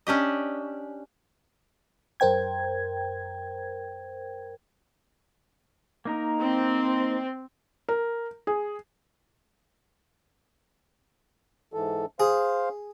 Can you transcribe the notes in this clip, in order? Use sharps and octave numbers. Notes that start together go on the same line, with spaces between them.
C#4 D4 G4 D#5
F#2 A#4 C5 G5 G#6
A#3 D#4 A#4
C4
A#4
G#4
G#2 E3 A4
G#4 C5 F5